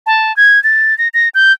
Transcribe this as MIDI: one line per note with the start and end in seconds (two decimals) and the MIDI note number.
0.06 0.35 81
0.37 0.62 92
0.64 0.97 93
0.98 1.08 94
1.14 1.29 94
1.35 1.53 91